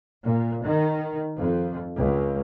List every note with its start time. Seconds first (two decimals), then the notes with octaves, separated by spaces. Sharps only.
0.25 A#2
0.65 D#3
1.38 F2
1.97 C#2